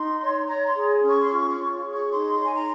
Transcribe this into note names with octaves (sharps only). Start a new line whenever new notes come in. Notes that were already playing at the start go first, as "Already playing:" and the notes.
Already playing: D#4 C6
C#5
C#5 A#5
C6
G#4
C#4
C#6
C6
F4 C#6
C#6
C#5
G#4
C#6
D#4 C6
C#5 G#5
A#5